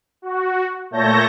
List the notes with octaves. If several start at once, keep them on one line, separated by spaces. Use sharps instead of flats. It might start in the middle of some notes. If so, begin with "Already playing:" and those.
F#4
A#2 A3 C#5 A5 G6 A#6